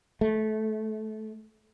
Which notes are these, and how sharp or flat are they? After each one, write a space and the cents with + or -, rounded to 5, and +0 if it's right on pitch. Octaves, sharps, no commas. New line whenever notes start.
A3 -20